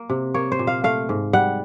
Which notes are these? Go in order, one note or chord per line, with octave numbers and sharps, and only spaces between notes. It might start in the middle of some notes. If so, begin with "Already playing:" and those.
Already playing: A#3
C3
A#3 C#5
C5
A#2
F5
A3 F5
G#2
G3 F#5